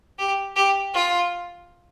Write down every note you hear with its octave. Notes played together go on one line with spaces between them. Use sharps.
G4
G4
F4